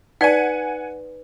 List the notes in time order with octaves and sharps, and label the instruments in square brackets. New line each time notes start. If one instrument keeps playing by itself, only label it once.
[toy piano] D#4 D5 [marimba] B4 [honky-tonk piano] F#5 G#5